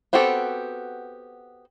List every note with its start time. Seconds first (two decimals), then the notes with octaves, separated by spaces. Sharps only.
0.13 B3 C4 F#4 G4 A4